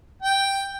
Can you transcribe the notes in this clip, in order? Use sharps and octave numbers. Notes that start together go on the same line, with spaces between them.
G5